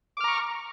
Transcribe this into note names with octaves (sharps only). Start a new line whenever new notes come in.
A#5 C#6 D6 F6